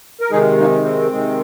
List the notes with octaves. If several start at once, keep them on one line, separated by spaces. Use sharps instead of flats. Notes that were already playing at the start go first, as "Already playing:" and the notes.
A#4
C3 D#3 G#3 D#4 G#4
A#3 D#4
C4
C3 D#3 G#3